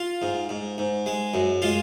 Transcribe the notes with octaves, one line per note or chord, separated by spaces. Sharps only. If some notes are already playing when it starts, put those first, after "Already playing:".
Already playing: F4
G#2
G#2
G#2
G#3
F#2
G#3 F4